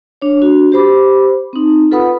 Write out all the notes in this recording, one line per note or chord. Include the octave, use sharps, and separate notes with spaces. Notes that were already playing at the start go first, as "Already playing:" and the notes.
D4 C#5
D4 F#4
G4 C5 B5 D6
C4 D#4
F4 A4 B4 F#5 B5 D#6